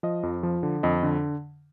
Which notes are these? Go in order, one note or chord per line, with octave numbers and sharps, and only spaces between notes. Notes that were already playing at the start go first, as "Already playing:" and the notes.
F3 D#5
F2
F3
D3
F2 D#5
D3